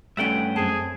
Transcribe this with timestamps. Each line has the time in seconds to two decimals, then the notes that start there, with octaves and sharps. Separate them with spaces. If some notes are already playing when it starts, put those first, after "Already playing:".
0.17 G2 A3 C#4 E5 F#5 G5
0.56 F#2 C4 G#4 A5